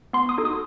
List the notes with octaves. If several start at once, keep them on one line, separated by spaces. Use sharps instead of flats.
B3 C6
D#6
D#4 F#4 A4
D#6